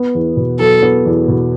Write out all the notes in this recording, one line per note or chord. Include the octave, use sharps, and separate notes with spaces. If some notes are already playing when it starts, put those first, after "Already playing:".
Already playing: B3
E2
B2
F#3 A4
B3
E2
B2